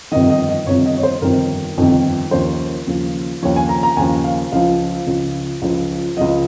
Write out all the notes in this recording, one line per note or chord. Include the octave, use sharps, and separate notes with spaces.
G1 F2 C3 D#3 D#5
D#5
D#5
G1 F2 C3 D#3 C#5
D#5
C#5
C5
G1 F2 C3 D#3 A#4
G1 F2 C3 D#3
D#2 C#3 F3 C5
D#2 C#3 F3
D#2 C#3 F3 C#5
G#5
A#5
A#5
D#2 C#3 F3 G#5
F5
C#2 C#3 F3 F5
C#2 C#3 F3
C#2 C#3 F3
C#2 C#3 F3 D#5